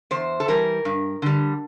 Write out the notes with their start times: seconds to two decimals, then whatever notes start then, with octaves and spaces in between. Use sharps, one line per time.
0.11 E2 C5
0.40 A4
0.48 E3 G3 A#4
0.85 G2
1.22 D3 G3